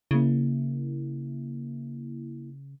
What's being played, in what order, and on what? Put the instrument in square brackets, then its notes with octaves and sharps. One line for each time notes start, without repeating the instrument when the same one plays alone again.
[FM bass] C#3 [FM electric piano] A#3 E4